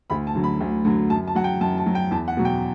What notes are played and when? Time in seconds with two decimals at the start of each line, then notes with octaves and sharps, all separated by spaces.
0.10 D2 B5
0.27 A5
0.35 D3 F#3
0.44 B5
0.60 D2
0.85 D3 F#3
1.10 F#2 A5
1.27 A5
1.35 F#3 F#5
1.44 G5
1.61 F#2 A5
1.78 A5
1.86 F#3
1.95 G5
2.11 E2 A5
2.28 F#5
2.37 B2 F#3
2.45 G5